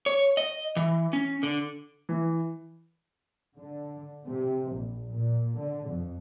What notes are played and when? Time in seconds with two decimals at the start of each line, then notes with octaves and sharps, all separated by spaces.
0.06 C#5
0.37 D#5
0.76 E3
1.13 C#4
1.43 D3
2.09 E3
3.56 D3
4.25 C3
4.72 A#1
5.09 A#2
5.57 D3
5.88 F2